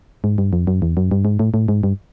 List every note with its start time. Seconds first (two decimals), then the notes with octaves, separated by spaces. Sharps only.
0.24 G#2
0.38 G2
0.53 F2
0.67 F#2
0.82 E2
0.97 F#2
1.11 G2
1.25 G#2
1.39 A2
1.54 A2
1.68 G#2
1.83 G2